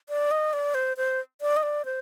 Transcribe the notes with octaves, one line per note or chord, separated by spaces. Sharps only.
D5
D#5
D5
C5
C5
D5
D#5
D5
C5